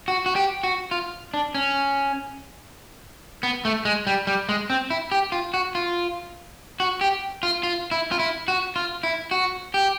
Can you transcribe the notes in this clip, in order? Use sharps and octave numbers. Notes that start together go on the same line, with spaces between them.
F#4
F#4
G4
F#4
F4
D4
C#4
B3
A3
G#3
G3
G3
G#3
C4
E4
G4
F4
F#4
F4
F#4
G4
F4
F4
E4
F4
E4
F#4
F4
E4
F#4
G4